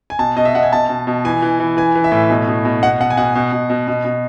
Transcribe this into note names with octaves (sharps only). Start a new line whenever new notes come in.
G#5
B2 A5
B2 D#5
E5
B2 F#5
G#5
B2 A5
B2
B2
E3 G#5
E3
E3
E3 G#5
E3
E5
A2
B2
B2
B2
B2 F#5
B2 F#5
G#5
B2 F#5
B2
B2
B2
B2
B2